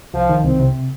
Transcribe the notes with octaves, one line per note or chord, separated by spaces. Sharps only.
C2 F3
D#3
C2 C4
C3